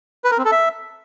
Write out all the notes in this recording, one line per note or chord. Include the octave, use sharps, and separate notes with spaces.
B4
A#4
C4
A4
E5